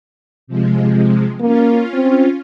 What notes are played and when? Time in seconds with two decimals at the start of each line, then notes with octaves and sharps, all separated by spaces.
0.47 C3 F3 G#3
1.40 A#3 C#4 F4
1.94 C4